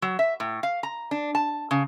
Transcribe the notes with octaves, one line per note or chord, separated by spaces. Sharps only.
F#3
E5
A2
F5
A#5
D4
A5
C#3